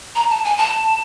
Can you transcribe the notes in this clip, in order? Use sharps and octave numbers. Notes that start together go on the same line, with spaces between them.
A#5
A5
G#5
A5